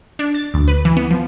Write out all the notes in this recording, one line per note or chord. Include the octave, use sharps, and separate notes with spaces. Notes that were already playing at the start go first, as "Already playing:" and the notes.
D4
A6
D2
B4
E3
B3
F3